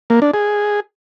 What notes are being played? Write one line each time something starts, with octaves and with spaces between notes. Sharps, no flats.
A#3
D4
G#4